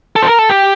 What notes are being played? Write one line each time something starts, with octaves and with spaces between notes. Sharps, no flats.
A4
C5
A#4
A4
G4